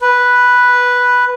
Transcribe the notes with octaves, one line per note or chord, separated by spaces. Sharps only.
B4